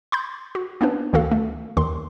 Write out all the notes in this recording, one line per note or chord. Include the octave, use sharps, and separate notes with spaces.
B5 C6 G6
F#4
A#3 B3 C#4 D4 B4
D2 D#3 A#3 F#4 A4 F5
A3
D#2 D#3 C6